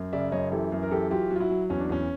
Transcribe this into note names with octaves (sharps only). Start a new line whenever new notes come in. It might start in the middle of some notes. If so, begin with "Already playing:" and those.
Already playing: F#2
C#3 D5 E5
F#2 C#5 D#5
E3 G4 A4
F#2
A#4
E3 G4 A4
F#3 F4 G4
F#3
F4
E4 F#4
F#3
E2 C#4
D4
E2 C#4